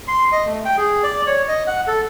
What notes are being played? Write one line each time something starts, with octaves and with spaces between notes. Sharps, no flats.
C6
D#5
A3
G5
G#4
D5
C#5
D#5
F#5
A4